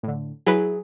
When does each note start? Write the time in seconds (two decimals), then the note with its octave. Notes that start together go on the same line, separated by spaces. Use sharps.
0.03 A2 D3
0.47 F#3 E4 G#4 B4